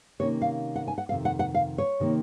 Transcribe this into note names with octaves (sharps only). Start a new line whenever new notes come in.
C3 D#3 A#3 C#4 C#5
F5
F#5
G#5
F#5
F2 C3 D#3 F5
F#5
F#5
F5
C#5
C3 D#3 A#3